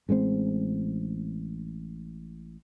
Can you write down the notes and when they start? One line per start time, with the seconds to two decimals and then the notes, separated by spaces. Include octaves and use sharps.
0.09 A1 G#3 A3 C4